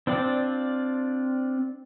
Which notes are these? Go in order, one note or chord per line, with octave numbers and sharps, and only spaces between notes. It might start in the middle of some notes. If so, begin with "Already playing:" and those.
C4 D4 F4 D5